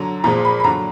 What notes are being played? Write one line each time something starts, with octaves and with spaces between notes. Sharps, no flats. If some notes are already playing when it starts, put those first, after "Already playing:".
Already playing: D3 F#3 A#5
A#2 F3 G#3 A#5
B5
B5
D3 F#3 A#5